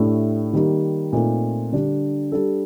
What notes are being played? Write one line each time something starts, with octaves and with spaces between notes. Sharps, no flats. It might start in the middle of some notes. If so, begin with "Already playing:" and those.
Already playing: A2 A3 D4 G4
D#3 G3 A#3 D#4
A#2 A3 C4 D#4
D3 G3 D4
G3 D4 A4